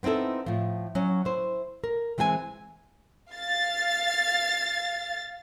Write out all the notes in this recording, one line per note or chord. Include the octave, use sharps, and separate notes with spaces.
B3 C4 D#4 E4 A4
A2 F3
F#3 C#4
E4 C5
A#4
E3 G#3 C4 G5 G#5
F5 A6